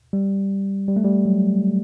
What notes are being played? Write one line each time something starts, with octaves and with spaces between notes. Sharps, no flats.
G3
G3
A3
G3
F#3